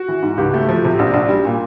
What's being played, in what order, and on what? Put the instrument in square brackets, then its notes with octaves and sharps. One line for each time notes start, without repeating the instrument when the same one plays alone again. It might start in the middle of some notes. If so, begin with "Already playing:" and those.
Already playing: [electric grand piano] F#4
[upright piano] E3
G#2
[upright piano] C#2 [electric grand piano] G4
[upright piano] A3
F3
C3
A#1
A#1
G3
A#2